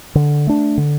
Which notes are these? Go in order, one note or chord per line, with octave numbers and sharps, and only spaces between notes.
D3
A3 D4
D3